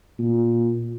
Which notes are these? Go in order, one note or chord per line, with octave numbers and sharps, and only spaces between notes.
A#2